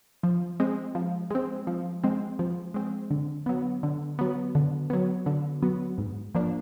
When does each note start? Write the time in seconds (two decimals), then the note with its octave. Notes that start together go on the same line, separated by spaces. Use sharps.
0.23 F3
0.60 G#3 C4
0.95 F3
1.31 G#3 C4
1.67 F3
2.04 G#3 C4
2.39 F3
2.74 G#3 C4
3.11 D3
3.46 F#3 B3
3.83 D3
4.19 F#3 B3
4.55 D3
4.90 F#3 B3
5.26 D3
5.63 F#3 B3
5.98 G#2
6.35 F3 A#3 D4